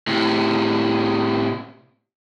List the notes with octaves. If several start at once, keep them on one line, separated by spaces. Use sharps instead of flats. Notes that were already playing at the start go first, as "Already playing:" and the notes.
A2 C3